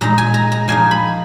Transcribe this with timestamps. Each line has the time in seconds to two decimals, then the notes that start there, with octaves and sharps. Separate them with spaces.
0.01 A#2 G#3 D#4 A#5
0.18 G#5
0.34 A#5
0.52 A#5
0.68 F3 A#3 D#4 G#5
0.91 B5